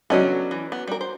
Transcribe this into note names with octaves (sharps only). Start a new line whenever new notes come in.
F#3 B3 C#4 D4 A4 D#5
E3
B3
G3 A#4
C5